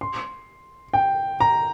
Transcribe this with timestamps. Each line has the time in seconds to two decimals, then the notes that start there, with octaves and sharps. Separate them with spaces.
0.01 C6
0.94 G5
1.40 A#5